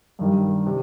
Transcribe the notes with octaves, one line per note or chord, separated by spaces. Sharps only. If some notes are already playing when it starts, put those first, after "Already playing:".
G2 D#3 G3
C3